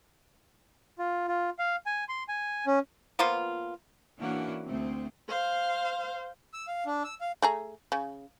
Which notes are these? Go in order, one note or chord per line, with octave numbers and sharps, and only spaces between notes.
F4
F4
F5
G#5
C6
G#5
C#4
F3 A#3 B3 F4
E3 A#3 C#4 D4 E4 F#4
D2 A3 C4
C5 F5
E6
F5
D4
E6
F5
A3 G#4 A#5
C#3